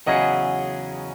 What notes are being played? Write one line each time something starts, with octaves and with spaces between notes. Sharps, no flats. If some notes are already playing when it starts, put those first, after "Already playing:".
E2 C#3 F#3 C#4 G#4 D#5 F#5